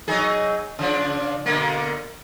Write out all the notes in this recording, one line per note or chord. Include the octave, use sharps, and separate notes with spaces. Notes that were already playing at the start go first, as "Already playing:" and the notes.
F#3 D#4 G#4
C#3 F3 D4
B2 D3 A#3